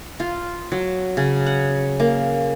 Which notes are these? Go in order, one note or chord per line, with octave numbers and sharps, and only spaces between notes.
F4
F#3
C#3
F#5
A#3